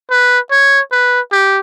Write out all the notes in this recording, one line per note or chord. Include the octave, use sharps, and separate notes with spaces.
B4
C#5
B4
G4